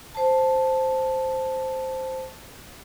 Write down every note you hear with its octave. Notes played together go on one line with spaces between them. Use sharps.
C5 A5